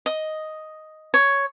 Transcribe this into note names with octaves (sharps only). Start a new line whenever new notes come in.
D#5
C#5